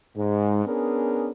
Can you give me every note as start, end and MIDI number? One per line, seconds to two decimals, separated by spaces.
0.16 0.62 44
0.66 1.31 59
0.66 1.31 61
0.66 1.31 62
0.66 1.31 68
0.66 1.31 70